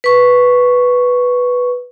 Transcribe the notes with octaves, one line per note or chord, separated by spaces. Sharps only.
B4 C#6